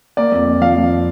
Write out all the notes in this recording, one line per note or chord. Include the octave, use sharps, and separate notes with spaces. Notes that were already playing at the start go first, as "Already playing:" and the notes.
A#3 D5
F2
F2
F3 F5
F3